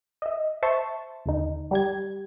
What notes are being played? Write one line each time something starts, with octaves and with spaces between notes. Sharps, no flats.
D#5 E5
C5 E5 A5 C6 C#6
D#2 D3 D#4
G3 G4 G#6